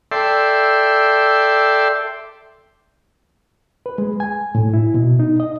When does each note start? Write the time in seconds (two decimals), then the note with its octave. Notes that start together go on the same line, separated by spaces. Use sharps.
0.12 A4 D5 E5 G5 C6
3.86 B4
3.98 G#3
4.20 G#5
4.55 A2
4.74 E4
4.94 B2
5.20 D#4
5.40 D#5